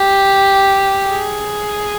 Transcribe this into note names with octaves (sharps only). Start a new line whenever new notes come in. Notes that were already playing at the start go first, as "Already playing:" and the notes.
Already playing: G4
G#4